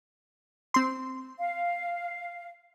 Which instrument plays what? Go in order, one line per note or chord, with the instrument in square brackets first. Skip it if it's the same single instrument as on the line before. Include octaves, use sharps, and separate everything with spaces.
[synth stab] C4 C6
[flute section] F5